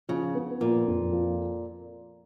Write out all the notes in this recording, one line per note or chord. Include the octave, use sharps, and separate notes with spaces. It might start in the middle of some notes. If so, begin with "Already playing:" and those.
C#3 F3
B3
A#2 F3
F2
F3